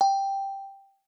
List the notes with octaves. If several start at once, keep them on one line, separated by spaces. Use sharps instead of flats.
G5